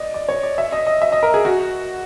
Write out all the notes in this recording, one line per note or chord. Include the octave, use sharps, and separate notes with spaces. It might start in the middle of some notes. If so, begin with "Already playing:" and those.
Already playing: D5 D#5
D5
C#5
D5
E5
D#5
D#5
E5
D#5
A#4
G#4
F#4